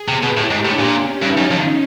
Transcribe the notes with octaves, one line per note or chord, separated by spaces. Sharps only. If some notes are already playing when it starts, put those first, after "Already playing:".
Already playing: G#4
C3
B2
A2 G4
G#2
A2 D4
A#2
C#4
G2 D#4
F#2
F2